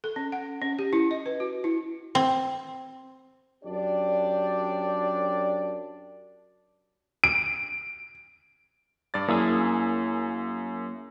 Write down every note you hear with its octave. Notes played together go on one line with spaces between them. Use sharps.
A4
C#4
F#5
C#4
G4
E4
D#5
B4
F#4
E4
C4
F#2 D4 G4 D5
D7
G2 D5 A6
F#2 A#3 E4 G#4